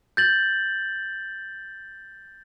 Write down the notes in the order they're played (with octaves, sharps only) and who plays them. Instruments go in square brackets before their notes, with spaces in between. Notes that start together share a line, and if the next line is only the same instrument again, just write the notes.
[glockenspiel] G6 A6 F#7